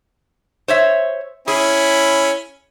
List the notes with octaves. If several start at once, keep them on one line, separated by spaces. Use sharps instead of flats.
C5 C#5 E5
C#4 E4 G#4